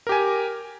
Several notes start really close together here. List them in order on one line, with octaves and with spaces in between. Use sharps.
A#4 G4 G#5